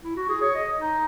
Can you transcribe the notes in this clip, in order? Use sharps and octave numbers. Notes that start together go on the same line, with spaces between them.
E4
F#4
G#4
C#5
D#5
D#4